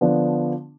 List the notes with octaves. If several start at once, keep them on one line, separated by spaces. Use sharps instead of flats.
D3 F3 B3 D4